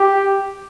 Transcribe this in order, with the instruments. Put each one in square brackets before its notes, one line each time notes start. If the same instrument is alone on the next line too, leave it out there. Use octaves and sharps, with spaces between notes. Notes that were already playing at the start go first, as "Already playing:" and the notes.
Already playing: [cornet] G4